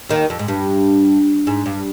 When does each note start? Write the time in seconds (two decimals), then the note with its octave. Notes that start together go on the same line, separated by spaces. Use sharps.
0.09 D#2 D#3
0.30 F2
0.39 G#2
0.48 G2
1.47 G#2
1.66 G2